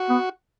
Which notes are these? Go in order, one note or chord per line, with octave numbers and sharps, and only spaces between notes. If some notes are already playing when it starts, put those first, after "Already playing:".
Already playing: F#4
B3